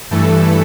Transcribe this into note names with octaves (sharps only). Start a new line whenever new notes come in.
G2 E3 A3 A4